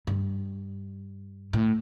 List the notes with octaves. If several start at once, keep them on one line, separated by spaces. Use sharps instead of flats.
G2
A2